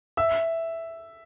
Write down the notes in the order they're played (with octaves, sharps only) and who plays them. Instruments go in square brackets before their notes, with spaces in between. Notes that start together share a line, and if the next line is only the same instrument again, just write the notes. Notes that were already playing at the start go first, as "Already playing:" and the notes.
[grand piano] E5 E6